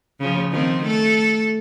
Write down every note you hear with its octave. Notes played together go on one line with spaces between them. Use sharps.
C#3 F3
D#3 F3 C4
A3 A4